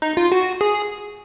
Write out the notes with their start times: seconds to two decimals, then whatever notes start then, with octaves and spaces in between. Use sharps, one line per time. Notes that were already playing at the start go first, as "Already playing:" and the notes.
0.02 D#4
0.17 F4
0.32 F#4
0.61 G#4